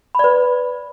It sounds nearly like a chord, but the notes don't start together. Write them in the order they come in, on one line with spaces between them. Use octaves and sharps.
B5 D5 B4